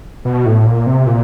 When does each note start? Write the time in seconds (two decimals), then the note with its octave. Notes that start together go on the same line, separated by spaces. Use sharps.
0.25 B2
0.46 A2
0.67 A#2
0.87 C3
1.07 A#2